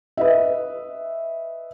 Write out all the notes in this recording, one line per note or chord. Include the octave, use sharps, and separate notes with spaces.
B4 D#5 E5